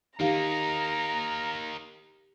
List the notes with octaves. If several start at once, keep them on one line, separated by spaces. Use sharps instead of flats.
D#3 A#3 D#4 G4 F5 A#5